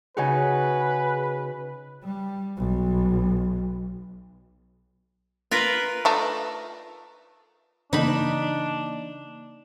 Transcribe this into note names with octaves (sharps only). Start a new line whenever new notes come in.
C#3 D#4 F#4 G#4 B4 F#5 G#5
G3
B1
F4 A#4 B4
A3 D4 D#4
C#3 E3 A#3 D4 D#4 B5